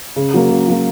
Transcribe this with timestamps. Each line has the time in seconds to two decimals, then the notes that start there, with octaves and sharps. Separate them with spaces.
0.16 C#3
0.34 F#3 A#3
0.50 C#3
0.68 F#3 A#3